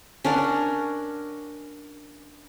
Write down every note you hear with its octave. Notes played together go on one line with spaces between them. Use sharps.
C#4 D4 A#4 F#5